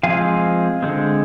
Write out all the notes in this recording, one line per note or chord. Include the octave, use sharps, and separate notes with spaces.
F3 G#3 C4 F5 G#5
D3 G#3 C4